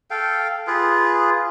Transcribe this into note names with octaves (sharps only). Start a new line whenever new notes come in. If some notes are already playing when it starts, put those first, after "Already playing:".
A4 F5 G5
F4 G#4 B4